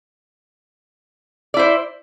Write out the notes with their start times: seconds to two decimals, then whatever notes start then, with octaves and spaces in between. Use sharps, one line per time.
1.54 D5
1.57 E4
1.59 C5